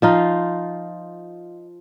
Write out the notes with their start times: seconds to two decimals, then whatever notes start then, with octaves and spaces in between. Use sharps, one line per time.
0.02 F3 D#4 F4